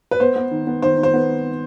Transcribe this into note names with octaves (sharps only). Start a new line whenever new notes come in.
B4
B3 C5
B3
D#3
B3
D#3 C5
D#3
C5
B3